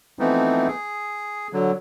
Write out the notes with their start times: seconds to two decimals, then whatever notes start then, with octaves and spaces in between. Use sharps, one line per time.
0.19 E3 F3 A3 B3 C4 D#4
0.68 G#4
1.53 D3 F#3